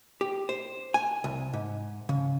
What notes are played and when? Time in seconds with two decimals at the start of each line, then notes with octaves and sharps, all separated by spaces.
0.21 G4
0.49 C5
0.94 G#5
1.24 C2
1.53 G#2
2.09 C#3